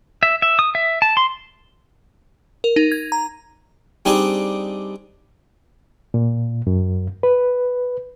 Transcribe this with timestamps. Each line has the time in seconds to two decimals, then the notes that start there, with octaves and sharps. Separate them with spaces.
0.23 E5
0.42 E5
0.59 D#6
0.75 E5
1.02 A5
1.17 C6
2.64 A#4
2.76 D#4
2.92 G#6
3.12 A#5
4.05 G3 C4 D4 D#4 G#4 D#5
6.14 A#2
6.67 F#2
7.23 B4